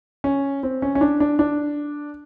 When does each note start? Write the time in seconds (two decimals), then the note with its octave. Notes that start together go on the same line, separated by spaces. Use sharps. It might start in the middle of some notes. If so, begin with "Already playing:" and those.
0.24 C#4
0.63 C4
0.82 C#4
0.95 C#4
1.01 D4
1.20 D4
1.39 D4